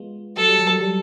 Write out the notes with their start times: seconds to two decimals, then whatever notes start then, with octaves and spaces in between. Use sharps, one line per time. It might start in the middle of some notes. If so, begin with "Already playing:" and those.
Already playing: G#3 B3 F4
0.37 F#3 A4
0.48 G3
0.59 F#3
0.70 G3
0.81 G3